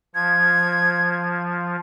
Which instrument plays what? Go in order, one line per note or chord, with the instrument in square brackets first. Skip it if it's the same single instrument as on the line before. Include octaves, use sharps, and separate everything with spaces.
[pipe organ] F3 [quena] G#6